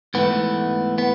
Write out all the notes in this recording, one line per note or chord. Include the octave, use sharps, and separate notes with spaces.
G#2 E3 A3 B3
B3